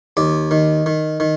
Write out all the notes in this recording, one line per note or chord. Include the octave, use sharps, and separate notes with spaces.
D#2 D5
D#3
D#3
D#3